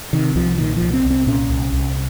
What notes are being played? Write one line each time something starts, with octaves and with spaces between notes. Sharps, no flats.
C3 D#3
C2 F3
A#2 D#3
C2 F3
C4
C2
C4
A#2 C#4
C2
C2